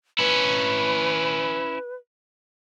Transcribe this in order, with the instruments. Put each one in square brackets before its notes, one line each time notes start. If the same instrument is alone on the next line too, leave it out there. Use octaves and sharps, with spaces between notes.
[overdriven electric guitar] C#4 E4 [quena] B4